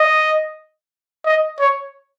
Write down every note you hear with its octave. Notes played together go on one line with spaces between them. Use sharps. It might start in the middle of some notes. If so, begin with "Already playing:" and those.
Already playing: D#5
D#5
C#5